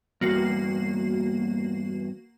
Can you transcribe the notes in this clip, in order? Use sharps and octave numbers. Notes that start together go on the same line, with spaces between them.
E2 G2 A#3 F#4 C7